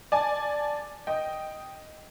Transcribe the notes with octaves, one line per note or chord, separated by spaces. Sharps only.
D5 G#5 A5
D#5 G5